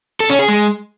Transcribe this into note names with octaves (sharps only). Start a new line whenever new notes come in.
A4
C#4
G#4
G#3